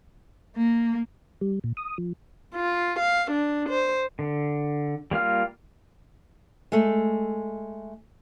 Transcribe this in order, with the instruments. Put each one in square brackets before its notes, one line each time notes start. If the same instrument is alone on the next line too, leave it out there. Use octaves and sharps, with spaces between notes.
[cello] A#3
[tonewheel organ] G3
A#2
D#6
F3
[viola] F4
F5
D4
C5
[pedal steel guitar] D3
G3 A#3 F4 F6
[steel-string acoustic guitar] G#3 A3